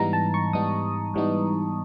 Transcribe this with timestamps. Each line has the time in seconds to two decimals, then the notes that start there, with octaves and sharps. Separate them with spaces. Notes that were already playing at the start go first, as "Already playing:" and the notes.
Already playing: G#2 E3 G3 B3 D#4 A#5
0.13 A5
0.34 C#6
0.53 G#2 E3 G3 B3 D#4 D#6
1.14 G#2 E3 G3 B3 D#4